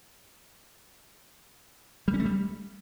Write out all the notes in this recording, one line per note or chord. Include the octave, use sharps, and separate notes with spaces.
G3
C#4
A3
G3